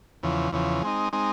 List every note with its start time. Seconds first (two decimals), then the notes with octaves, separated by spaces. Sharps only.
0.23 E2 C#3 F3
0.52 E2 C#3 F3
0.82 G#3 C4 D#4
1.13 G#3 C4 D#4